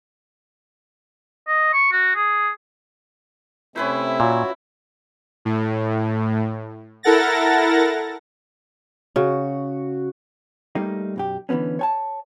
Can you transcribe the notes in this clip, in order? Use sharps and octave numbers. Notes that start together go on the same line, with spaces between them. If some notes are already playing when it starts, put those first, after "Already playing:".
D#5
C#6
F#4
G#4
C3 A3 C4 C#4 E4 B4 C5
A#2 F4 F#4 C#5
A2
E4 A4 A#4 F#5 A6 A#6
C#3 F#4
G3 A3 A#3 D#4
B1 F#2 G4
D3 E3 F3 B3 C#4
C#5 G#5 A5